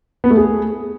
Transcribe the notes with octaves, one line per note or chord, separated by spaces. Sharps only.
B3
A3
G#4